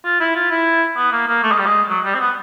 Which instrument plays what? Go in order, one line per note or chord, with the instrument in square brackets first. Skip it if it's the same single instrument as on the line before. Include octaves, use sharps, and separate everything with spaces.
[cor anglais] F4
E4
F4
E4
B3
A#3
A#3
A3
G#3
G3
G#3
F#3
G3
C4
B3